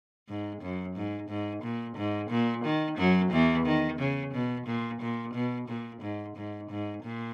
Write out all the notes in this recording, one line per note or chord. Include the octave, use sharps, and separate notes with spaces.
G#2
F#2
G#2
G#2
A#2
G#2
A#2
D#3
F#2 F#3
E2 E3
D#3
C#3
B2
A#2
A#2
B2
A#2
G#2
G#2
G#2
A#2